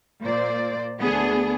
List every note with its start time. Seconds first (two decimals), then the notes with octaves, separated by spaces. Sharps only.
0.23 A#2 C5 D5
1.00 D2 B3 D4 G#4